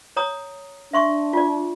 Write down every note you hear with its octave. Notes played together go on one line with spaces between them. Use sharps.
C#5 A#5 D#6
D4 E5 C6 C#6
F4 D5